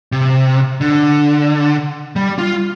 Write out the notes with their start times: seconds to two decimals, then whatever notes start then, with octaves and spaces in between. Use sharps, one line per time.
0.12 C3
0.81 D3
2.16 G3
2.38 F4